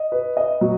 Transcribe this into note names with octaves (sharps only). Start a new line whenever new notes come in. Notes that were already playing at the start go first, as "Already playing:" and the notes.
Already playing: D#5
B4
D#5
F#3